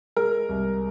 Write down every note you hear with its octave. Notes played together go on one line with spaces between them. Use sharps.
G#3 A#4
C2